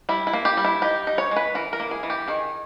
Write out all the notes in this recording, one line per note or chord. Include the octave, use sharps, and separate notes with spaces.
G3 E4
E4
A#3
G4
G3
E4
D#4 G4
D#4
C#5
G#3
B4
E3 A#4
A#4
A#3
G#4
E3
G4
D#3 G#4